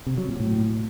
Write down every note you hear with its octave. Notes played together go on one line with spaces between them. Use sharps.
C3
F#3
A#2
A2